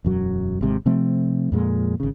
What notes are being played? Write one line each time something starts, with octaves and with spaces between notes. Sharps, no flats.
E1 F#2 F#3
G#1 C3 G#3
C3 F3 A3 C4
F2 A#2 G#3
G#1 C#3